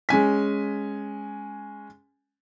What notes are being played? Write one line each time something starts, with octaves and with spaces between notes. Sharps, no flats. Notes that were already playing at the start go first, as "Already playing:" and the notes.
G#3 C#4 G#5 B6